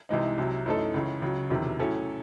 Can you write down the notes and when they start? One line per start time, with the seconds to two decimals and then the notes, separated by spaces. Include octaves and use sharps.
0.09 C2 C3 E3 G#3 D#4
0.38 C2 C3 F#3
0.66 F#2 E3 A3 D#4 A4
0.94 C#2 C#3 E3
1.22 C#2 C#3 F#3
1.50 E1 E2 C3 D#3 F#3
1.79 A2 F#3 C#4 E4 A4